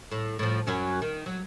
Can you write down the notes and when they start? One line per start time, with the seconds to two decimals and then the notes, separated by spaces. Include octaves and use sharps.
0.11 A2
0.39 A2 F3
0.67 F#2 F#3 C#4
1.02 D#3
1.26 F#3